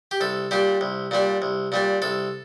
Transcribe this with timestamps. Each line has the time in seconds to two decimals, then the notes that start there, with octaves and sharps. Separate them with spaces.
0.11 G4
0.21 C2 A4
0.51 A#2 G3 D4 G4
0.81 C2
1.11 A#2 G3 D4
1.42 C2
1.72 A#2 G3 D4
2.02 C2 A4